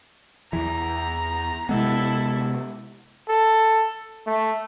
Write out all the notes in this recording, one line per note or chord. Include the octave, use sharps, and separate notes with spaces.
E2 E3 A#5
C3 G#3 B3 E4 A4
A4
A3